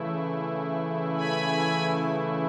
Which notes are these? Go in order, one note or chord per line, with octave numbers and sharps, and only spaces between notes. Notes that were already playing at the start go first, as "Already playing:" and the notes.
Already playing: C#3 E3 A3 E4
G#5 B5